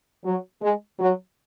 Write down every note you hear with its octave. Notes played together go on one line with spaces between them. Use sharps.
F#3
G#3
F#3